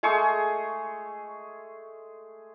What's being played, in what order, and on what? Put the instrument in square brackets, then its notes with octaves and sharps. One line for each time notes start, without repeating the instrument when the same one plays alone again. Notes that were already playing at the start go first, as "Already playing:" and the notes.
[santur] G#3 A3 G#4 C#6